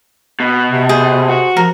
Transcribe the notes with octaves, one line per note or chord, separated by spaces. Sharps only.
B2
C3
G#4 C5
F#4
F3 A#4